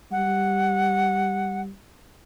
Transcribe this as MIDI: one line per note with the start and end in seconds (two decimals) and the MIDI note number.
0.12 1.70 55
0.12 1.61 78